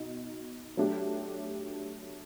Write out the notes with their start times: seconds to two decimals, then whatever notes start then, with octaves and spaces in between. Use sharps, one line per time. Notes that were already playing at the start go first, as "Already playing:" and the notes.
Already playing: B2 D#4 F#4
0.77 F#3 A3 D4 G4